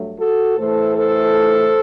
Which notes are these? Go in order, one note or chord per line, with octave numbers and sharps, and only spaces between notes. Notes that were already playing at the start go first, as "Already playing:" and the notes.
Already playing: G2 F#3 A3
F#4 A4
A2 E3 A3 A4 C5
A4 C5